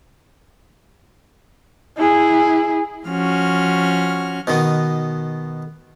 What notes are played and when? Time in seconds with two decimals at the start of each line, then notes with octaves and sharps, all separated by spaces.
1.98 E4 G#4
3.08 F3 C#4 F#4 F6
4.47 B2 D#3 B3